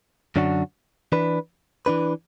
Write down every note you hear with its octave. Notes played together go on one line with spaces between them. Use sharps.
F#2 D3 F#3 D4 F#4
E3 D4 B4
E3 D4 B4